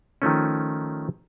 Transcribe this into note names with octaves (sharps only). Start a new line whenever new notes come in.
D#3 F3 A3 C#4